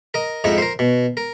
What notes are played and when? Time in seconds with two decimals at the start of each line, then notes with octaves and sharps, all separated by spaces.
0.14 A#4 D#5
0.44 F2 G#2 D#4 E4
0.58 A#4 C5
0.79 B2
1.17 A#4